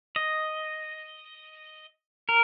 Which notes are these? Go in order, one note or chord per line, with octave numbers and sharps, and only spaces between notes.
D#5
A#4